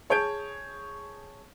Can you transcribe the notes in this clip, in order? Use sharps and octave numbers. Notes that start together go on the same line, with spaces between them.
G#4 C#5 A5 G6 D7